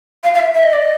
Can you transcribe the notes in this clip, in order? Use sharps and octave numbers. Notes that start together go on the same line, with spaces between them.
F5
F5
E5
E5
D#5
D5
D#5